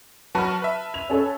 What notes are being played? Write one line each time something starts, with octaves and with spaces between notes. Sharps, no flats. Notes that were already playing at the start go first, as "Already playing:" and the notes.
F#3 F#4 B4 A5 F6
B4 E5
F7
C#4 A4 C#5